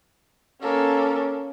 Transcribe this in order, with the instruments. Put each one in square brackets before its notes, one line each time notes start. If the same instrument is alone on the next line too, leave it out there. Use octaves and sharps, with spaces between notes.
[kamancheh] A#3 A4 [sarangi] C#4